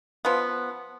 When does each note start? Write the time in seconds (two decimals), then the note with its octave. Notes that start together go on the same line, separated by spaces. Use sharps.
0.25 F3 B3